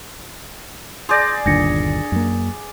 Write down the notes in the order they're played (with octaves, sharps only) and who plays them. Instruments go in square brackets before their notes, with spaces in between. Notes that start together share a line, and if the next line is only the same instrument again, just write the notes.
[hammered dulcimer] G#4 D5 [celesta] C6 G6 A#6
[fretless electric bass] G1 D#2 A#2 [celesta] D4 A#6 C#7
[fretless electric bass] F#2 A#3